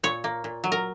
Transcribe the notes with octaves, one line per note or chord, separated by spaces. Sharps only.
A#2 C#5
A#3
A#2
F#3
A#4